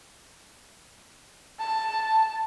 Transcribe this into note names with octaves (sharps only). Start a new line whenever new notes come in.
A5